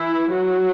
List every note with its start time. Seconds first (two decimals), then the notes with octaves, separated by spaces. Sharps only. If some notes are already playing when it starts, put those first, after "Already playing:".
Already playing: E3 E4
0.32 F#3 F#4